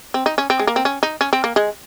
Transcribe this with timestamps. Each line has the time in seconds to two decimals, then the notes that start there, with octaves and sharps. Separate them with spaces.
0.14 C4
0.26 D#4
0.38 C#4
0.50 C4
0.59 G#3
0.67 A#3
0.76 C4
0.85 C#4
1.03 D#4
1.21 C#4
1.33 C4
1.44 A#3
1.56 G#3